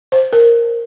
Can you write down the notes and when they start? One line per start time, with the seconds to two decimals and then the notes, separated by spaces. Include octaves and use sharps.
0.12 C5
0.33 A#4